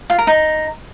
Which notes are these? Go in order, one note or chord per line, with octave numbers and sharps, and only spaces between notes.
F4
A#4
D#4